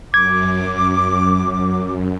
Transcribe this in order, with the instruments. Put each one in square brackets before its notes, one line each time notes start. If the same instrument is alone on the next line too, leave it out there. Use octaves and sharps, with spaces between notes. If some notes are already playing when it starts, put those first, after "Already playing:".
[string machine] F#2 [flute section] D6 [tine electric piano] G#6